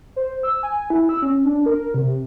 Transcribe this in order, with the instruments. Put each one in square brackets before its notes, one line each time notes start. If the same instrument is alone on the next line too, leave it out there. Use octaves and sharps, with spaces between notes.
[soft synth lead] C5
E6
G#5
E4
E6
C#4
D4
A#4
C3